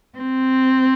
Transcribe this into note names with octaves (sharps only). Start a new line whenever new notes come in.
C4